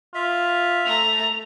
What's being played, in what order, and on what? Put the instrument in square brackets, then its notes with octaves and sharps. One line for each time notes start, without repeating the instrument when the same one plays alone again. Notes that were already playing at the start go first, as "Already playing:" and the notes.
[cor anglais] F4 [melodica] E5
[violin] A3 A#5 [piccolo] F7